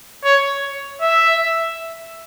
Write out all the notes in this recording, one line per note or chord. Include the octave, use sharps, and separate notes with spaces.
C#5
E5